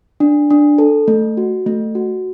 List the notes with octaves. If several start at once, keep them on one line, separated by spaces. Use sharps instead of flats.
D4
D4
A4
A3
F#4
A3
F#4